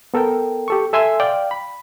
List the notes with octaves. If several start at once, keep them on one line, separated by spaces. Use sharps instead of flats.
B3 A4 A#4 G5
G4 A4 C#6
A4 E5 G#5 C6 E6
D5 F5 G5
B5